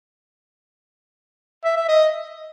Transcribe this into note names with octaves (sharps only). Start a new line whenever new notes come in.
E5
E5
D#5